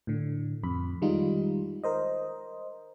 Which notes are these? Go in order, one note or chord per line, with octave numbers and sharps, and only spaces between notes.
A2 D3
F2 B5
D#3 G3 G#3 D#4 F4
A#4 C5 D#5